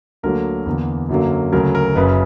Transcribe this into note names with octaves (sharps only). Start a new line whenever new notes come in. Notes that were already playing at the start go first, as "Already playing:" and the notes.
D2 D3 F#3 A#3 A#4
E2 D3 A#3
F#2 D3 F#3 A#3
D2 C#3 F#3 A#4
A#4
F#1 F#2 C#3 B4